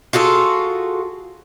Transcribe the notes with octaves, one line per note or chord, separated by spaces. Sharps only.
F4 F#4 G#4 A4